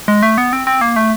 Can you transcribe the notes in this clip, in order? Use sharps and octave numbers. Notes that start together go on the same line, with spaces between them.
G#3
A3
B3
C4
C4
A#3
A3